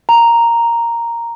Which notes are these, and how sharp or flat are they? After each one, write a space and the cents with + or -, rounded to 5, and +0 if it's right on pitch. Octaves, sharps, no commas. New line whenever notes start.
A#5 +0